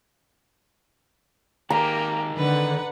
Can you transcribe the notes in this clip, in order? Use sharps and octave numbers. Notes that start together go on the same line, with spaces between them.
D#3 A#3 D#4 G4 G#4 A#5
D3 B4 F#5